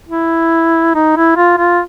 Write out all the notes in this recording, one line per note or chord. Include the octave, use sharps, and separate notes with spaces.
E4
D#4
E4
F4
F4